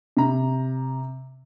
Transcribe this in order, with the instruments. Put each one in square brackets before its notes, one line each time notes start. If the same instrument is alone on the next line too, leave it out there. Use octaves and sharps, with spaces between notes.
[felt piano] C3 A#5